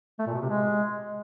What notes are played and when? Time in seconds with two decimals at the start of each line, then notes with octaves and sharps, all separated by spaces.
0.19 A3
0.27 A#2
0.34 B2
0.42 C3
0.49 G#3